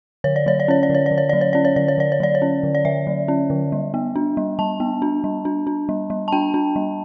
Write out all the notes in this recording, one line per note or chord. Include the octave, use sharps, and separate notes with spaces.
D3 C#5
D5
F#3 C#5
D5
C#4 C#5
D5
D3
C#5
D5
D3
C#5
F#3 D5
C#5
C#4 D5
C#5
D3 D5
C#5
D3 D5
C#5
F#3 D5
C#5
C#4
D3
D5
D3 E5
F#3
C#4
D3
G3
B3
D4
G3
G3 A5
B3
D4
G3
D4
D4
G3
G3
A5
D4 G5
D4
G3